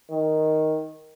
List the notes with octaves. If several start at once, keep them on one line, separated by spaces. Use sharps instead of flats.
D#3